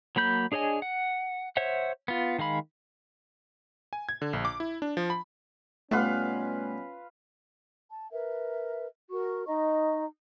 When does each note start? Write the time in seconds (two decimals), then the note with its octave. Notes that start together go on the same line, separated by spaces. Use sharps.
0.16 F#3 A#3 B5 G6
0.52 D4 G#4 C#5 D#5 G#5
0.82 F#5
1.57 C5 C#5 E5 F#5
2.08 B3 F4
2.38 D#3 G#3 F5 B5
3.93 G#5
4.09 G#6
4.22 D3
4.33 A#1
4.45 D6
4.60 E4
4.82 D4
4.97 F3
5.10 B5
5.91 B2 G3 A3 B3 C#4 F4 B4 F5
7.92 A5
8.10 A#4 B4 E5
9.10 F#4 A#4 C#6
9.47 D#4 D#5 A#5 C#6